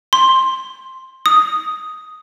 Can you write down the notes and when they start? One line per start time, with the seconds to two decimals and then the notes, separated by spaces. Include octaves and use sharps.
0.13 C6
1.26 D#6